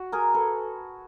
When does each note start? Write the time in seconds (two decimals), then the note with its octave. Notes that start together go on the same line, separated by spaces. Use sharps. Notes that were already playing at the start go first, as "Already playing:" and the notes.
Already playing: F#4
0.12 G#4 A#4
0.34 A4 B4